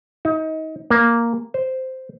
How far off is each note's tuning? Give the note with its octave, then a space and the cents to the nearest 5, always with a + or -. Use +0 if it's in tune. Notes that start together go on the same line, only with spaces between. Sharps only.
D#4 +30
A#3 +0
C5 -10